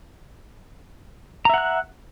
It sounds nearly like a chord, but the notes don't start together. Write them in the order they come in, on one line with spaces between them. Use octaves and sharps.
A#5 E5 F#5 F#6